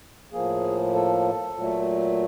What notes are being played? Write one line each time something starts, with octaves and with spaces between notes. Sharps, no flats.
A2 F3 A#3 G#4
A4
A#2 F#3 A3